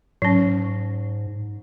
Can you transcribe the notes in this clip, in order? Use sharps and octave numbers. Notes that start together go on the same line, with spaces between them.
G#2 F#3 C#4